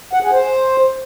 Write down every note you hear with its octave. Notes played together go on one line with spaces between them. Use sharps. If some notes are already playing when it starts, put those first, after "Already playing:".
F#5
G#4
C5